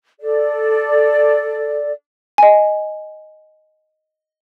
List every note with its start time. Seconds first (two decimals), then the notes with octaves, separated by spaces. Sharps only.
0.20 A4 D5
2.38 D#5 G#5